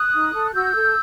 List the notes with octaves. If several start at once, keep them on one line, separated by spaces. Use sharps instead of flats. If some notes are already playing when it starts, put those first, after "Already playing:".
Already playing: D#6 F#6
D#4
A4
F#6
F#4 E6 G6
A4